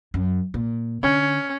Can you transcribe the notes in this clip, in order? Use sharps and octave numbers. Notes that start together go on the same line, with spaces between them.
F#2
A#2
D3 C#4